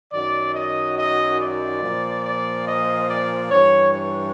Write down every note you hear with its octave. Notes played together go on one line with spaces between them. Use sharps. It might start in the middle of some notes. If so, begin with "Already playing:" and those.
F#2 D#3 F#3 D5
D#5
D#5
D5
A#2 F3
D5
D#5
D5
G2 E3 C#5
C#5